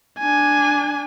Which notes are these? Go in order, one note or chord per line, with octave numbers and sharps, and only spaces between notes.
D4 G#5